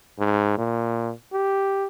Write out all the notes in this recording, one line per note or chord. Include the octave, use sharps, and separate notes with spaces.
G#2
A#2
G4